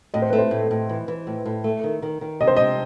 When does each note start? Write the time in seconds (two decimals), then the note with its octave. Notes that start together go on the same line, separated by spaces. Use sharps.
0.14 A2 D#5
0.22 C5
0.30 A3 B4
0.38 C5
0.51 A2
0.71 A2
0.89 E3
1.08 E3
1.27 A2
1.46 A2
1.64 A3
1.84 D#3
2.02 D#3
2.21 D#3
2.40 C3 D#5
2.47 C5
2.57 C3 D#5